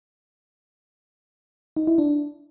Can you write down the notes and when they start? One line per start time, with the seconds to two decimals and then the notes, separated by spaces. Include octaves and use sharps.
1.77 D#4
1.87 E4
1.98 D4